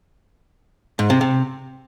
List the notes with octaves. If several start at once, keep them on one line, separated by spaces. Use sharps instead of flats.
G#2
C3
C3